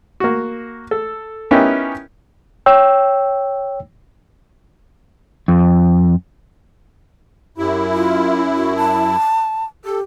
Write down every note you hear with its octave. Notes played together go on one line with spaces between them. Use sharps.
A#3 F#4
A4
B3 C#4 D#4 E4 G4 A#4
C#5 G5 E6
F2
F#2 E4 G4
F4
F#4
A5
G4 A4